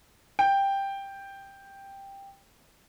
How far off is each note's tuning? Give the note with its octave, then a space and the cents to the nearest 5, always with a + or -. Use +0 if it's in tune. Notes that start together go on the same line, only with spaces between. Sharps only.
G5 +5